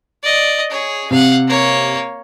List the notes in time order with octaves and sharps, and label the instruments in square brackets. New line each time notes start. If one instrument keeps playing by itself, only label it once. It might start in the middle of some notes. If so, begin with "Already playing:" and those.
[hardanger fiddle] D5 D#5
G#4 C#5
[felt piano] C3 [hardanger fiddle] F5 F#5
[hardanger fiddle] A#3 C#5